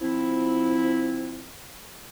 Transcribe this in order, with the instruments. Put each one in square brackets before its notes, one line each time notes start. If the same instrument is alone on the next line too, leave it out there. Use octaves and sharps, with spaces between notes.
[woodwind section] F3 C4 E4